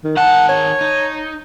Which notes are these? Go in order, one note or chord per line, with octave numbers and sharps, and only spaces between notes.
D#3
D#3 F#5 A5
C#5
D#4